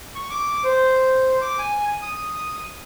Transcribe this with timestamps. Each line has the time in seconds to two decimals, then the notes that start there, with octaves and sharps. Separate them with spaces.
0.15 C#6
0.30 D6
0.64 C5
1.41 D6
1.59 G#5
2.02 D#6